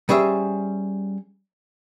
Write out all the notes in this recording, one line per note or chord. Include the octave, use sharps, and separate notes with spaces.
G3 C#4 G#4 C5 E5